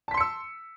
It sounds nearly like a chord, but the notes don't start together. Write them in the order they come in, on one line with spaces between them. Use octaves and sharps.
A5 B6 C6 C#7 E6